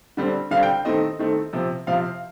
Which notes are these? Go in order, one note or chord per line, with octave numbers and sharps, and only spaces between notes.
D3 G3 C4
D3 G3 C4 F5
G5
D#3 A3 C4 D#5
D#3 A3 C4
C3 F3 C4
C3 F3 C4 F5